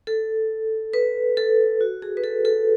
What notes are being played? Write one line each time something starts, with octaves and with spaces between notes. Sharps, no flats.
A4
B4
A4
F#4
G#4
B4
A4
A4